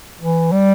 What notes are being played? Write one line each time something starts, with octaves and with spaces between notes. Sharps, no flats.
E3
G3